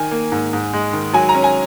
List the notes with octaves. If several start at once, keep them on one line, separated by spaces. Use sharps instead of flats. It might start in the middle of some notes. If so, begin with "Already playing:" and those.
Already playing: D#3 G#5
A#3
G#2
G#2
G#3
D#3
F#3 G#5
A#5
C#4
G#5